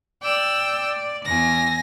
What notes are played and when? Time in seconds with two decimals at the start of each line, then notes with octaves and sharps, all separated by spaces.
0.23 D5 G5 E6
1.26 E2 G#5 A#6